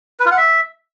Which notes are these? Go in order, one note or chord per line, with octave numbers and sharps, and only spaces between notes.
B4
F4
F#5
E5